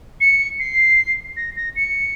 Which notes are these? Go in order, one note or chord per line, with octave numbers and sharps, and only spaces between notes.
C#7
C7
A#6
A#6
C#7